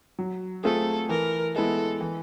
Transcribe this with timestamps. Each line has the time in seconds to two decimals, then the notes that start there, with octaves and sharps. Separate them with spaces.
0.19 F#3
0.64 A3 C4 F4 G#4 A4
1.09 E3 A#4
1.55 G#3 B3 E4 A4
2.01 E3